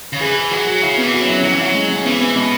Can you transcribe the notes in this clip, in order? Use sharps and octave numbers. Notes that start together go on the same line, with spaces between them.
C#3
E3 G#4
G#4
F#3 G#4
F#4
C#3 E4
B3
E3
F#4
F#3 C#4
E4
C#4
F#3 E4
E3
F#3 C#4
G#3
G#3
C#3
E3 B3
B3
B2 G#3